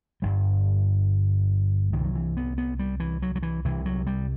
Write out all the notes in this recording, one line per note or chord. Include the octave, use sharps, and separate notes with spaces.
G1 G2 G3
C2 D#3
C3
F#3
E3
B3
B3
G3
E3
F#3
F#3
E3
C2 C3 E3
F#3
G3